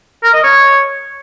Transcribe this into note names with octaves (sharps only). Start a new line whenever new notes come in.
A#4
D#5
C#5